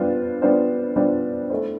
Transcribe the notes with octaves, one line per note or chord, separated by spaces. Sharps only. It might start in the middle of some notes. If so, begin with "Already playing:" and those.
Already playing: G3 B3 D4 F4 C5
G3 B3 D4 F4 C5
G3 B3 D4 F4 C5
A3 E4 A4 C5